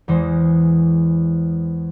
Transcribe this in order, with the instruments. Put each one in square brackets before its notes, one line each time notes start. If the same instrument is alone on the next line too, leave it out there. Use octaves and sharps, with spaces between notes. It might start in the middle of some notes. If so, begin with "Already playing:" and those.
[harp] E2 E3 G#3 C5